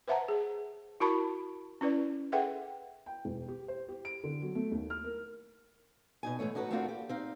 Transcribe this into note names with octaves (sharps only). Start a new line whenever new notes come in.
B4 C5 E5 F#5 A5 A#5
G#4
E4 F#4 A#4 A5 B5 C#6
C#4 E4 B4 D5
G#4 A4 B4 E5 F#5 G5
G5
E1
G4
C5
G4
D7
D3
F#3
A3
D#2
F6
A#4
B2 D#4 G#5
G#2 E3 A3 C#5
A2 D#4 F#4 A4 B4
A3 A#3 C4 D4 F4 F#4
G4
C4 D#4 F5